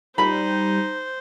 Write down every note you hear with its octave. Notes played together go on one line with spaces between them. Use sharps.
G3 D#4 C5 B5